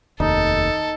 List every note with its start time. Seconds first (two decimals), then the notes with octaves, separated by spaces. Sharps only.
0.20 F1 D#2 D#4 A4